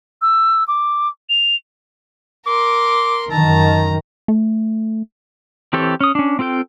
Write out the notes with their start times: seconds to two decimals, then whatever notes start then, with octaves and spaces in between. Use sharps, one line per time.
0.22 E6
0.68 D6
1.29 F7
2.47 A#4 C6 D6
3.31 F#2 D#3 A5 A#5
4.28 A3
5.73 E3 C4 G4 A4 C#5
6.01 C#4 D#6
6.15 C#4 D4
6.39 C4 F4 A4 G5